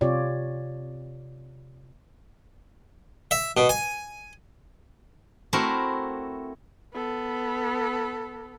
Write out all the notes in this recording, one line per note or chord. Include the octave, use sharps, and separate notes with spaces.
C3 F4 G4 C#5 D5
E5
B2
G#5
A3 C4 E4 F#4 A#4
B3 A4